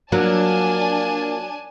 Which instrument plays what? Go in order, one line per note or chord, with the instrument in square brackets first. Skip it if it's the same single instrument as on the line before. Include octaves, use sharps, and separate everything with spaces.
[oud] F#3 [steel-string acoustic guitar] A#3 F4 [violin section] D4 G#5 A5